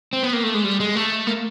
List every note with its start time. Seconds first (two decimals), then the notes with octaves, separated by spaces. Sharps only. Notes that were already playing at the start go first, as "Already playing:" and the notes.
0.13 C4
0.23 B3
0.33 A#3
0.43 A3
0.54 G#3
0.64 G3
0.80 G#3
0.95 A3
1.27 A#3